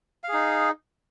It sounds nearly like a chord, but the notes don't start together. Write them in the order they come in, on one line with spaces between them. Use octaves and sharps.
F5 G#4 D#4